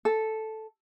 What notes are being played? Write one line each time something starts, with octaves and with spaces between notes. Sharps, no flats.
A4